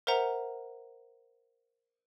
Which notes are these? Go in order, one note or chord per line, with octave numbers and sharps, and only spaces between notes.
A#4 C5 E5 F#5 A#5